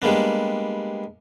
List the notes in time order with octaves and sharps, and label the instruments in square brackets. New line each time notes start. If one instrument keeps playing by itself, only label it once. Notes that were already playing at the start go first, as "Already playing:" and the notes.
[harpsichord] G3 G#3 A#3 B3 D4